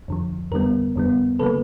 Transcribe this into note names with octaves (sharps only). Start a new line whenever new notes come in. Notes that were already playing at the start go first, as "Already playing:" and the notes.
F2 D3 F3
F2 D3 G3 B3 A#4
F2 D3 G3 B3
C#3 F#3 A#3 A4 B4